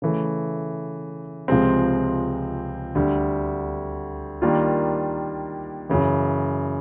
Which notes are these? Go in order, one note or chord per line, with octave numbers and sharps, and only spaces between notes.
C#3 E3 A3
C#2 C3 F3 G#3 C4
D2 D3 G3
D#3 G3 A#3 D4 F4
F#2 C#3 E3